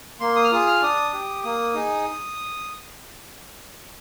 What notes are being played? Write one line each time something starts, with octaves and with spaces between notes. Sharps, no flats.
A#3 C6
D#6
F6
F4 G#4 D#6
F6
D4 D#6
G4
A#3 D#6
D#4 G#4